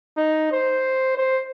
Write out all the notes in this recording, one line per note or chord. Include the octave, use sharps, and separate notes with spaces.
D#4
C5
C5